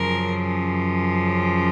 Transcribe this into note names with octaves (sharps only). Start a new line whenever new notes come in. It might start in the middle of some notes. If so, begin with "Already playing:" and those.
Already playing: F#2 C#3 F3 A#4